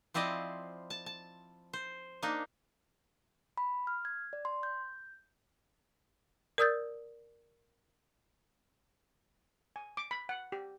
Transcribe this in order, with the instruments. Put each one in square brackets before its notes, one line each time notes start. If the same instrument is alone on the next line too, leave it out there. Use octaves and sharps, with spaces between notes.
[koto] F3 C4 E4 D5 D#5
A5
A5
C5
A#3 D4 D#4
[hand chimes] B5
F6
G#6
D5
C6
G6
[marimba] A#4 D5 D#6 E6 G6 A6
[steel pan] G#5
D6
B5
F#5
G4